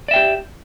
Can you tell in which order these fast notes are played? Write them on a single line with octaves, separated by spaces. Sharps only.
D5 E5 G5 G4